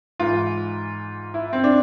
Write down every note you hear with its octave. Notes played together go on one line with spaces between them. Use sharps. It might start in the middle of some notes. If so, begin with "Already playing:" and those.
G#2 E3 F4
E4
C4
D4